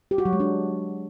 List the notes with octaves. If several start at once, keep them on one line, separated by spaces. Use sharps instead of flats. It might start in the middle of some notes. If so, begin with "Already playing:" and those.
G4
F#4
F#3
G#3
D4